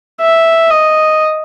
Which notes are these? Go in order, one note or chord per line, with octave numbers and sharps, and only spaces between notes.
E5
D#5